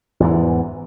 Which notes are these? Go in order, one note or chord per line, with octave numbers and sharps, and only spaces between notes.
E2 G#2 E3